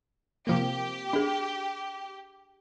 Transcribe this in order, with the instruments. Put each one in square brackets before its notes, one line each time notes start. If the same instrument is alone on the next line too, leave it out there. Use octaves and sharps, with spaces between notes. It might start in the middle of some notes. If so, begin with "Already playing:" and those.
[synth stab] C3 F3 A#3 [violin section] G4
[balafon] D4 G#4